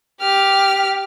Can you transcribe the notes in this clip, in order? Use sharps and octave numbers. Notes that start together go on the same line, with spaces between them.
G4 F6